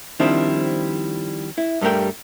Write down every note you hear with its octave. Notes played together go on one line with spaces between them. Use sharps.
D#3 F3 G3 C4 D4 E4
E4
G2 G3 A3 A#4 G5